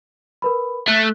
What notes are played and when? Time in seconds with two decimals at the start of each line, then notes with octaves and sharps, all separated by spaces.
0.42 A#4 B4 B5
0.88 A3 F#6